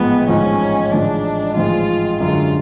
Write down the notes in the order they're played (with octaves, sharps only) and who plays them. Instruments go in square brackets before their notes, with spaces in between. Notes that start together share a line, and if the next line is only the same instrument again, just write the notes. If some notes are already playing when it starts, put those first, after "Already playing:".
Already playing: [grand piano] A1 G#2 F3 G#3 [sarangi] B3
[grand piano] A1 G#2 F3 G#3 [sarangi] C#4
[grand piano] A1 G#2 F3 G#3 [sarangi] D4
[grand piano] A1 G#2 F3 G#3 [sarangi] F4
[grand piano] F#2 D3 G#3 [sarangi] F4